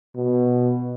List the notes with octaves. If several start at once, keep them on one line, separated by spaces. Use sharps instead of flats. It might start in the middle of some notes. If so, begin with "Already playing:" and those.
B2